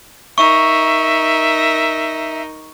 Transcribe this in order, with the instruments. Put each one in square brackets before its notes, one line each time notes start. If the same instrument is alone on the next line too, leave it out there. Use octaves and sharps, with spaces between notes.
[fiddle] D#4 A#4 [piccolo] E5 [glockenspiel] C#6